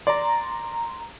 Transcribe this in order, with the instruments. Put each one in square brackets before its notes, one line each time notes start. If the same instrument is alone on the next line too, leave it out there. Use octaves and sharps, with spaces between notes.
[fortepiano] D5 [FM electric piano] A#5 C6